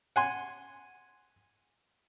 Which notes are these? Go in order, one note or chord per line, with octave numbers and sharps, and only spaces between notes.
F#5 G#5 C6